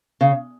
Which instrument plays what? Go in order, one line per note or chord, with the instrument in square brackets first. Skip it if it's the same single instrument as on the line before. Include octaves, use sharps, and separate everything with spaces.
[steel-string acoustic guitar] C#3